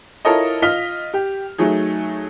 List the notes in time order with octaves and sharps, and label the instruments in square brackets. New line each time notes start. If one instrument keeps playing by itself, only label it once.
[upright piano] E4 F4 A4 A#4 C#5 D#5
F4 D#5 F6 B6 G7
G4
F#3 A3 D#4 G#4